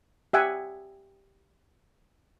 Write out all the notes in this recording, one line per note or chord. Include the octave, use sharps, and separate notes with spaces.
G4 E5 F#5 G#5